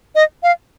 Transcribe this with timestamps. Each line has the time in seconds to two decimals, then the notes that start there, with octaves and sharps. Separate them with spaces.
0.15 D#5
0.43 F5